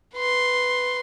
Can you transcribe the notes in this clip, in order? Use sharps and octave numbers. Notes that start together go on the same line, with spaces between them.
B4 C6